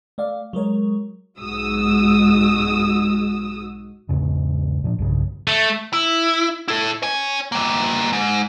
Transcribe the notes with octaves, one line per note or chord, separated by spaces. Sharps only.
A3 D5 F5
F#3 G#3 A#4 C#5
B1 G#2 G#3 F#4 D#6 E6
E2 G#2 C#3
A#2 F3 D4
B1 G2 C#3
A3
E4
E4 A4
C#5 G#5
G3 A#3
G#2